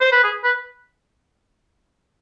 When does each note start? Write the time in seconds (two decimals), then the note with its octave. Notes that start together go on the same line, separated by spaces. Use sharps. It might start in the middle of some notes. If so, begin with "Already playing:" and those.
0.01 C5
0.12 B4
0.23 G#4
0.44 B4